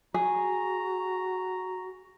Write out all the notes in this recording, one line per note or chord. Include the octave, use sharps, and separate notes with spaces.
F#4 G#4 A#5